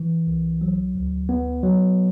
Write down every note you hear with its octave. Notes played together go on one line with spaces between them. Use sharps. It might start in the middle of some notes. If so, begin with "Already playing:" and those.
Already playing: E3
C2
F#3
D2
B3
F#3